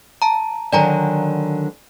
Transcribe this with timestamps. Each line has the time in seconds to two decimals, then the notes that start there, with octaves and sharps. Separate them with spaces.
0.22 A5 A#5
0.72 D3 D#3 F#3 D5 G#5 A#5